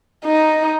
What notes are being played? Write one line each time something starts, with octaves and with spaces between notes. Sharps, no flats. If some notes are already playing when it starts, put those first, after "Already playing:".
D#4